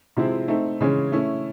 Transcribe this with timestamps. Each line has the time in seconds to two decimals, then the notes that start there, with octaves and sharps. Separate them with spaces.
0.17 C3 F3 G#3 C4 E4
0.48 A3 C4 D#4
0.80 C#3 E3 G#3 C#4
1.12 A3 C#4 E4